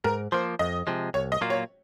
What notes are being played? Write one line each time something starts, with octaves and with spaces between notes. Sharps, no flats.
G#2 A#4
F3 A#3 C5
F2 D#5
C3 F3 G#3
C2 C#5
D#5
A#2 F#3 A#3 F4
C#5